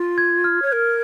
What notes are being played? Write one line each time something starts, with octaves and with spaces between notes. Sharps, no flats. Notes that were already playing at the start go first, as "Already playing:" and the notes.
Already playing: F4
G#6
F6
C#5
A#4